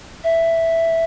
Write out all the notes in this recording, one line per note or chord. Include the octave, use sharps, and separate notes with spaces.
E5